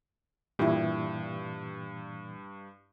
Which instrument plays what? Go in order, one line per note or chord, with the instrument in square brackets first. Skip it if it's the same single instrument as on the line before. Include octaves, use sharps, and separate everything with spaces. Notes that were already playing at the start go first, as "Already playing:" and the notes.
[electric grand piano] G2 [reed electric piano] A#2 E3 [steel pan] E4 F4 G4